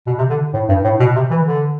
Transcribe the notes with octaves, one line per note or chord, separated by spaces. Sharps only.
B2
C3
D3
A2
G2
A2
B2
C3
E3
D3